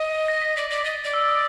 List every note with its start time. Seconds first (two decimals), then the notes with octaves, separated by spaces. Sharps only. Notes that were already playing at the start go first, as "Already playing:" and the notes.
Already playing: D#5
0.28 A#6
0.42 B6
0.57 D5 B6
0.70 D5 A#6
0.85 D#5 A6
1.04 D5
1.14 E6
1.28 D#6